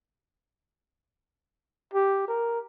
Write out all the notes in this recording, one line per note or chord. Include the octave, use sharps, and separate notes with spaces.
G4
A#4